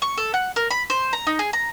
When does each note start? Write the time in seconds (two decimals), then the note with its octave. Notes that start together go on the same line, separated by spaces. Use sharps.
0.02 C#6
0.17 A4
0.34 F#5
0.56 A#4
0.71 B5
0.90 C5
1.13 A#5
1.27 D#4
1.39 G#4
1.53 A#5